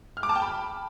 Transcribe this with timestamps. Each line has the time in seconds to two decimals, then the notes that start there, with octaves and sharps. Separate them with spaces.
0.17 F6
0.23 D6
0.29 A5
0.36 G5
0.42 B5